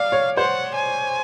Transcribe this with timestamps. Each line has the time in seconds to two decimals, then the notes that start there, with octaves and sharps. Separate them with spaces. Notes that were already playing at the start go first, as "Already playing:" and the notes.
Already playing: D5 F5
0.12 C#5
0.37 C5 F#5
0.75 G#5